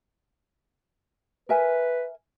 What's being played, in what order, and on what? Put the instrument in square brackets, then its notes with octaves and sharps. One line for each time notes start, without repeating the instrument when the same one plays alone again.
[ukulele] A#4 E5 G#5 [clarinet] B4